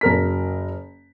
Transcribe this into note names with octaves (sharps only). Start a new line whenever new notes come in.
F#1 A#4 B6